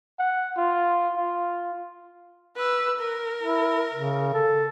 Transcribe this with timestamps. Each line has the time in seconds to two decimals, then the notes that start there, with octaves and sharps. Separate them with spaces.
0.19 F#5
0.58 F4
1.17 F4
2.56 B4 E6
2.99 A#4
3.43 E4
3.94 C#3
4.34 A4